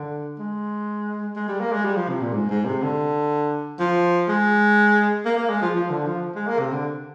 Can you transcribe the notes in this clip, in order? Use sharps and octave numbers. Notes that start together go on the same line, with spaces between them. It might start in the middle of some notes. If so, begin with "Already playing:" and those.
Already playing: D3
G#3
G#3
G3
A#3
G#3
G3
F3
C3
A#2
G#2
G#2
C3
D3
F3
G#3
A#3
A#3
G#3
F3
F3
D3
F3
G#3
A#3
C3
D3